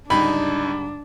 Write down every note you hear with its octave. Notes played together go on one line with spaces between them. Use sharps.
C#2 G#2 D3 G3 D4 D#4 B5